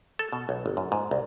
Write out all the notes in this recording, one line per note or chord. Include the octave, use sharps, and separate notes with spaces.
A4
B2
B1
G1
F#2
G#2
C2